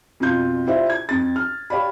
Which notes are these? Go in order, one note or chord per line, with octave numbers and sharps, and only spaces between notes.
F2 B2 F4 G6
E4 F4 G4 C5 D5 E5
G#6
F2 A6
F6
G4 C#5 D5 F5 B5